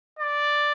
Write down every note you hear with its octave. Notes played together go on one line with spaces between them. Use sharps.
D5